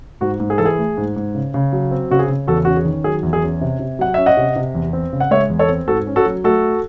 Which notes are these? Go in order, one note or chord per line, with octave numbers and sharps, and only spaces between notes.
G#2 F#4
G#2
G#4
E3 A4
G#4
A3
G#2
G#2
C#3
C#3
F#3
C4
C#3 F#4
G#4
C#3
E2 F#4 A4
C#4 F#4
G#4
D#3
F#3 G#4
E2
G#4
C#4
C3
C3
F#3 F#5
C#4 E5
D#5 F#5
C3
C3
E2
C4
C#3
F#5
G#3 C#5 E5
E2
A4 C#5
C4
G#2 F#4 A4
C#4
F#4 A4
F#3
A3 F#4 A4